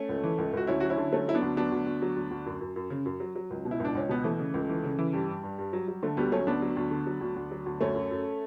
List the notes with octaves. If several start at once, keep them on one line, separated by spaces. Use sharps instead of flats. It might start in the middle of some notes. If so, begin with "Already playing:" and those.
Already playing: A3 C#4
C#2
E3
C#2
C#2 F#4
D2 C#4 E4
F#3 F#4
C#4 E4
D3
F#3 A3 C#4
F#3 E4
B3 D4
D2
F#3 B3 D4
D2
D2
F#3
D2
D2
F#2
F#2
F#2
C#3
F#2
F#3
F#3
C#2
B2
E4
C#2 D4
C#2 C#4
B2 B3
E3 A3
C#3
C#2
E3
C#3
E3
G2 G3
G2
G2
G2
F#3
F#3
D3 A3
D2 G3 B3
F#3 A3 C#4
D2 B3 D4
F#3
D2
D3
F#3
D2
D2
F#3
D2
F#2 A3 C#4
F#2
F#2